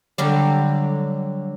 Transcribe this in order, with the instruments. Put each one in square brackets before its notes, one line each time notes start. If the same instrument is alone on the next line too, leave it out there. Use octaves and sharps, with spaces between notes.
[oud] D3 F#3 G3